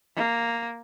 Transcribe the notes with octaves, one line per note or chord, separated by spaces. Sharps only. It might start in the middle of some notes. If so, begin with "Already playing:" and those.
A#3